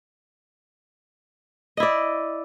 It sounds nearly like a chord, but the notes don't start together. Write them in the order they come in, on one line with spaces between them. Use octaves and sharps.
D#5 E4 D5